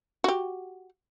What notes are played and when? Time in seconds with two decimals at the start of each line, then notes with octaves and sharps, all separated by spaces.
0.24 F#4 G4